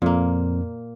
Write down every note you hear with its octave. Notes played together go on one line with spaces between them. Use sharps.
F2 A#2 A#3